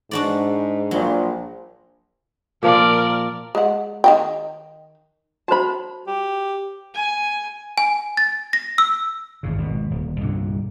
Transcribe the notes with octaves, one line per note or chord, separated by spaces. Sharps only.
G#2 D4 F#4 D5
A#1 F#3
A#2 F3 F4 A#4 D5
G#3 F#5
D#3 D#5 G5
F#4 C5 A5 B5
G4
G#5
G#5
A6
A#6
E6
G#1 A2 C#3
G#1 B2
D#1 D2
C2 G2 A#2 D3